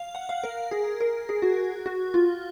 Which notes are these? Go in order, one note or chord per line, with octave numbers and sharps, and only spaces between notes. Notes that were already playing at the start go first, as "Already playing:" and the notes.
Already playing: F5
F#5
F5
A#4
G#4
A#4
G#4
F#4
F#4
F4